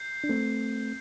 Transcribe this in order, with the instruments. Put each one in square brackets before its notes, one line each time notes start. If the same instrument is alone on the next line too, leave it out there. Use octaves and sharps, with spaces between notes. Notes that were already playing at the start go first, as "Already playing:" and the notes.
Already playing: [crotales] G6 C7
[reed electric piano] D4
A3 C4